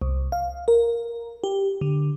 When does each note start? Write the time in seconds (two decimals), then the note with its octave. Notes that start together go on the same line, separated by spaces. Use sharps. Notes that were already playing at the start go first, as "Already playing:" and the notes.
0.02 C2
0.32 F5
0.68 A#4
1.44 G4
1.81 D3